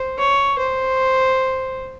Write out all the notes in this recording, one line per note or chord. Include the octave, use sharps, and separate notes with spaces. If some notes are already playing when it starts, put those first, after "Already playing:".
Already playing: C5
C#5
C5